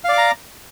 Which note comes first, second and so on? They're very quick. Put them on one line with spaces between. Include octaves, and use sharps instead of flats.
F5 D5 D6 A#5